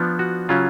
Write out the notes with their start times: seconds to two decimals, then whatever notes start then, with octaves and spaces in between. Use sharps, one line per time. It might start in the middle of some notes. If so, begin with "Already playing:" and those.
Already playing: F3 B3 D4
0.19 F#4
0.49 C#3 F#3 C#4 F4